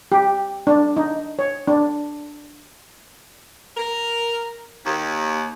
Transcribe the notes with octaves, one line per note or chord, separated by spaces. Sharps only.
G4
D4
D#4
C#5
D4
A#4
D#2